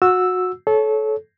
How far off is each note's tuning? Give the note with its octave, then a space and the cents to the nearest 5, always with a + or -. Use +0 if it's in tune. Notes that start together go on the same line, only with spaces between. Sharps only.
F#4 -20 E6 +0
A4 -25 C#5 +0